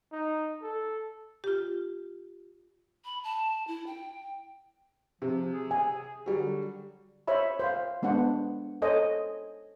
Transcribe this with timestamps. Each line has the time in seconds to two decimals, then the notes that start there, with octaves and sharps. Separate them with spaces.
0.12 D#4
0.62 A4
1.44 F4 G4
3.05 B5
3.24 A5
3.68 E4
3.87 G5
5.22 C3 F3
5.53 G#4
5.71 G#5
6.26 D3 F#3 G3
7.28 C5 C#5 E5 B5
7.59 C5 F5
8.02 G#3 B3 D4 C5 F#5
8.82 A4 C5 C#5 D#5 G#5